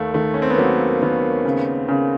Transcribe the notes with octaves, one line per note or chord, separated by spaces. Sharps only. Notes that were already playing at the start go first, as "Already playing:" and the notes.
Already playing: D#2 A3
D#3 A3
C#4
C4
B3
F#3 A#3
D#3 B3
C#3
C#3